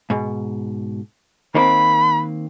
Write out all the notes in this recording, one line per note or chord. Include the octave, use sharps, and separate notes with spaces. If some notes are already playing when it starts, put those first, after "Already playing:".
G#2 B2
D#3 A#3 C4 B5